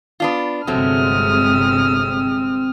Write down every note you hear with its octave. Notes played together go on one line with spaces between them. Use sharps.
B3 D4 F4
G1 C3 F#3 G#3 A3 C4 D#6 F6